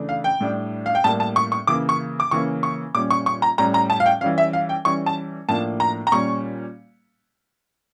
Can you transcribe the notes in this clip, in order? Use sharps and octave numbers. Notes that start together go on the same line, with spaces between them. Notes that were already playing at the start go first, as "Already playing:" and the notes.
Already playing: C#3 E3 A3 D4
F5
G5
A2 G3 D4
F5
G5
A2 G3 A#3 A5
A5
C#6
C#6
C#3 E3 A#3 D6
C#6
D6
C#3 E3 A#3 C#4 C#6
C#6
A#2 G3 C#4 D6
C#6
C#6
A#5
A2 G3 C#4 A#5
A#5
A5
F5
G5
E3 G3 C#4 F5
E5
F5
G5
E3 G3 C#4 C#6
A5
A2 F3 A#3 D4 A5
A#5
A#5
A#2 G3 C#4 C#6